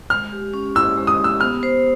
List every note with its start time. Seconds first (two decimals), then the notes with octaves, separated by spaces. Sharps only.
0.10 G#3 F6
0.32 G4
0.54 C#4
0.75 E4 E6
0.97 G#3
1.07 D#6
1.19 G4 E6
1.40 B3 F6
1.63 C5